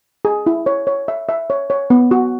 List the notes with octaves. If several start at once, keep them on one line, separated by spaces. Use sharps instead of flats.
G#4
E4
C#5
C#5
E5
E5
C#5
C#5
B3
F#4